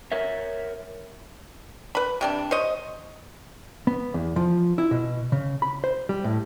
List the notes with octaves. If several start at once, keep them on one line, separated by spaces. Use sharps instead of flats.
A#4 C#5 E5
B4 B5
C3 G3 D4
C5 C#5 D#5
B3
E2
F3
E4
B2
C#3
B5
C5
G3
A2